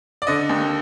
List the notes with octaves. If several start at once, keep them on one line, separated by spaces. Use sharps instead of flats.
D5
D3 D#5
D#2